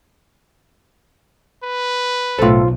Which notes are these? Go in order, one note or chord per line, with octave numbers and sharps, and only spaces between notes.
B4
B1 A2 F4 A4 C5